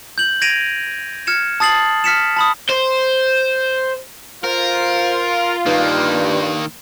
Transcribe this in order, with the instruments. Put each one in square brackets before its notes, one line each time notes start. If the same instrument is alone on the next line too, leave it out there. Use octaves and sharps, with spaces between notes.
[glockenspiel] G6 F#7
G#6 A#6 D7 D#7 F7
F6 G#6 C#7 E7
A5 D#6 A6 C7 F#7
F6 B6 C#7 E7
A5 B5 D#6
[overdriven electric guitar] C5
[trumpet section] F4 [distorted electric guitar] A#4 [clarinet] C5
[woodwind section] G2 [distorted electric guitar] D#3 A#3 [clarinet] D#4